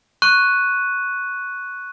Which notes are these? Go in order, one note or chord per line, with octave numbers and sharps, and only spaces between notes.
C#6 F#6 D#7